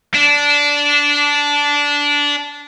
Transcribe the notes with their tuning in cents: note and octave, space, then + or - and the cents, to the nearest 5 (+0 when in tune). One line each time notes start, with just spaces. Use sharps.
D4 -15